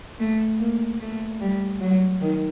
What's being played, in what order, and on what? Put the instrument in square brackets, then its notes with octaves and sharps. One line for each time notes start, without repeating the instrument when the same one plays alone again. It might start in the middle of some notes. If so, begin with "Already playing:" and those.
[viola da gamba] A3
A#3
A3
G3
F#3
D#3